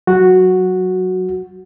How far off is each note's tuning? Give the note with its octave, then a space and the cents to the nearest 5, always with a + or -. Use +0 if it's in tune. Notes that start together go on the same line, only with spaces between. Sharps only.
F#3 +0 F#4 -5